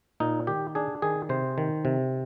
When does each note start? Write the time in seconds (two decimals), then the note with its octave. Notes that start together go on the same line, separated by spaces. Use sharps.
0.20 A#2 D#4
0.47 D#3 G4
0.75 D4 G#4
1.02 D#3 G#4
1.29 C3 C5
1.58 D#3
1.85 C3